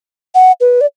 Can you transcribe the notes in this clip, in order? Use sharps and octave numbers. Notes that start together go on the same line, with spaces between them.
F#5
B4
D5